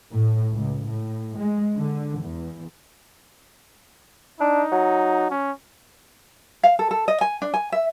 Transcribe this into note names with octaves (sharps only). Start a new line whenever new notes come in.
A2
C#2
A2
G#3
D3
E2
D4 D#4
F#3
C#4
F5
A4
A4
D#5
G#5
D4
G#5
E5